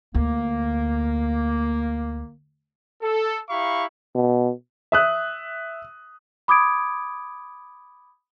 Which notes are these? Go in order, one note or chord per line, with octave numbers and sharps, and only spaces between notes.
D2 A#3
A4
E4 G4 F5 A#5 B5 C#6
B2
E5 D#6 F#6
B5 D6 D#6 G#6 D7